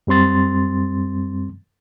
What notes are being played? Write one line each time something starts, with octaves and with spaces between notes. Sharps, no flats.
F#2 G3 C4 C6 A6